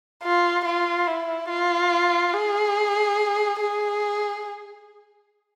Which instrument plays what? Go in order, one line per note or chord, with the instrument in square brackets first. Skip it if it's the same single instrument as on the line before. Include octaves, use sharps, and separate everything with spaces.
[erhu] F4
F4
E4
F4
G#4
G#4